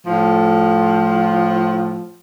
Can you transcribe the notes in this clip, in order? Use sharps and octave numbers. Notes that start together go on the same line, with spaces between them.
A2 F3